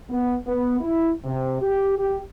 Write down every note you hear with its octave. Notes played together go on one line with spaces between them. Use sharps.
B3
B3
E4
C3
G4
G4